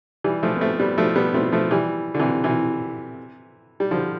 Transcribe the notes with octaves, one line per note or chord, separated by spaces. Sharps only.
E3 G3
F3 A3
B3
A3 C4
G3 B3
F3 A3
G3 B3
A3 C4
F3 A3
E3 G3
D3
C3 E3
C3 E3
G3
D3 F3